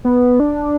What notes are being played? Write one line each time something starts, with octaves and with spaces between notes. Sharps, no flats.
B3
D4